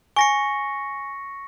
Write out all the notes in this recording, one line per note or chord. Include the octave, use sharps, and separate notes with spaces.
G#5 C#6 A#6 C#7